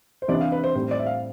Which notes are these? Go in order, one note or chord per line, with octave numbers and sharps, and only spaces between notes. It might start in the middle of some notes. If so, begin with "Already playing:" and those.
C5
C3 E3 B3 D4 D5
F5
B4
C5
A2 G3 C4 C5
D5
E5
F5